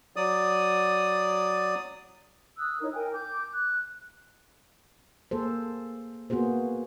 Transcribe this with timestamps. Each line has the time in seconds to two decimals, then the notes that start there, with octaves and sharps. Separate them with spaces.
0.16 F#3 D5 D#6
2.58 D#6 E6 F#6
2.81 D#4 E4 A#4 C#5
2.92 A#4 G5 G#5
3.12 D6 G6
3.53 F#6
5.31 A#3 G#4 A4 C5
6.30 A#3 B3 F#4 G#4 C5